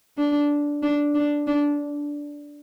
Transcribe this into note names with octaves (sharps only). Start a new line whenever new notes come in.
D4
D4
D4
D4